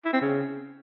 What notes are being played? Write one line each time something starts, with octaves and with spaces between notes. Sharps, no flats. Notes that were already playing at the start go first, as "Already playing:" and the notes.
E4
C4
C#3